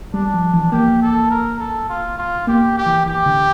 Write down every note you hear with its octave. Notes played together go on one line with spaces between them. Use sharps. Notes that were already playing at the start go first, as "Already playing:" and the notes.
G3 D4
F3
E3
A#3 G4
A4
A#4
A4
F4
F4
A#3 G4
G4
E3
E3 G4
D3